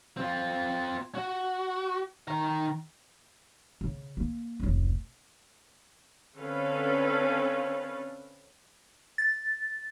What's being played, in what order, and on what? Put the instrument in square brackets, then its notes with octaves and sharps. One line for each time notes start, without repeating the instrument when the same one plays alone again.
[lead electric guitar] C4 F4
F#4
D#3 A#5
[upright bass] C#3
A#3
F1 C#2
[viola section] D3 C4 C#4 A4 B4 F5
[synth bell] A6